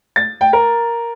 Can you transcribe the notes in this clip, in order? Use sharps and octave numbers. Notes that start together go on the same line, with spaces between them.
A6
G5
A#4